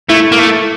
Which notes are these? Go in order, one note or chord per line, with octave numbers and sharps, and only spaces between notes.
A3 E4
A#3
A3